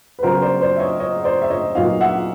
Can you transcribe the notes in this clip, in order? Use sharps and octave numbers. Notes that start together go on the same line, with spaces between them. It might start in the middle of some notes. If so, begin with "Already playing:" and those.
B4
C#3 F#3 B3 A#4 C5
C5 D5
C5 D5
E5
C#5 D#5
C#5 D#5
C5 D5
E5
C#5 D#5
A#2 F#3 B3 D#4 D#5 F5
E5 F#5